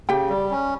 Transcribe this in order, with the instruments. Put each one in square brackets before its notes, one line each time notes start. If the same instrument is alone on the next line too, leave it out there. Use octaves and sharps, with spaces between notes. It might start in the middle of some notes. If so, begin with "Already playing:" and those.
[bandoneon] C#3 [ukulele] G4 G5
[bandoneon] G3
C#4